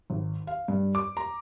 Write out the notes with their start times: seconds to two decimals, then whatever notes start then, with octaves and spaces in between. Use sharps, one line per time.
0.10 G#1
0.47 F5
0.68 G2
0.95 D6
1.17 A#5